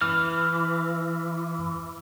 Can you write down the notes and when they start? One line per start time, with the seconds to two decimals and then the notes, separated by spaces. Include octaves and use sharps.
0.02 E3 F6